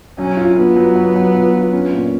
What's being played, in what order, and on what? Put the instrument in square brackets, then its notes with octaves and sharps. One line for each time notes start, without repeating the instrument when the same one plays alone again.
[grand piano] F#3 [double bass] C#4
[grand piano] F4
[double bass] B3 [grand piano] F4
[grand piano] F#3
F#3
F#3
F4
F4
C#4
A#2